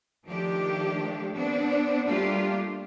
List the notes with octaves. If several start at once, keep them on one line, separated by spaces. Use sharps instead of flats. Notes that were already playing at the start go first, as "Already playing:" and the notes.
D#3 F3 A3 D4 G4
B3 C4 D4
G3 A3 A#3 D4 F4 G4